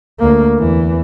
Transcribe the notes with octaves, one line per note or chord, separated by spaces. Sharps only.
D2 A#3
E2 E3